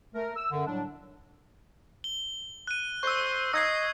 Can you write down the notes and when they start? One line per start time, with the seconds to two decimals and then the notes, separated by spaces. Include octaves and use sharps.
0.15 A3 A#4
0.36 E6
0.51 F#2 D3
0.66 A2 F#3 G3 D4
2.04 G7
2.67 F#6 D#7
3.03 C5 C#6 E6
3.53 D#5 E6 G#6 C7